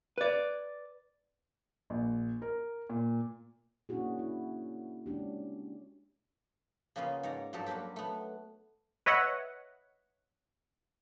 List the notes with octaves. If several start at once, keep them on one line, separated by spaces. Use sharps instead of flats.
B4 D5
A#1
A#4
A#2
A#3 C#4 D4 E4 F#4 G#4
E4
G#3 C#4 D4 G4
C#3 A#3 B3 C#4 F4 G#4
G#2 C#5 D5 A#5
G2 F3 F#3 F#4 G4 A4
F#3 G3 A#3 C4 G4
A3 B3
B4 C#5 D#5 E5 F#5